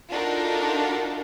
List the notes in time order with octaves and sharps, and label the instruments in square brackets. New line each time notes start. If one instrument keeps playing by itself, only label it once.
[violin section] D4 D#4 F4 F#4 A4 A#4